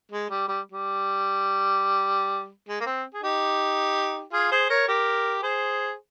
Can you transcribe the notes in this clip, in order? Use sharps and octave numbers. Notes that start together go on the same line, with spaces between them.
G#3
G3
G3
G3
G#3
A#3
C4
G#4
D#4 G4
F4 G#4
G#4 C5
A#4 C#5
G4 A#4
G#4 C5